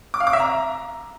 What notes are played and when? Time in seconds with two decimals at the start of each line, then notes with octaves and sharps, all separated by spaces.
0.14 D6
0.20 F5
0.27 D6
0.33 E5
0.40 A#5